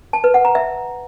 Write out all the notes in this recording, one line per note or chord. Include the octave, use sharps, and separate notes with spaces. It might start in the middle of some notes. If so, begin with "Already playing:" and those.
A5
B4
F#5
A#5
E5